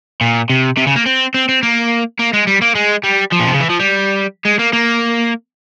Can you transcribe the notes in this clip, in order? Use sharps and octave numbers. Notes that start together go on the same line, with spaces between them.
A#2
C3
C3
C#3
A#3
C4
C4
C4
A#3
A#3
G#3
G3
A#3
G#3
G3
F3
A#2
C3
C#3
E3
F3
G3
G#3
A#3
A#3